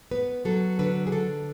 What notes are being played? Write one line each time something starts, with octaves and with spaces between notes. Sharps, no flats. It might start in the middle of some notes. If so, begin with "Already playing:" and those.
B3 B4
F#3 A4
D3 B4
G#4
D3 A4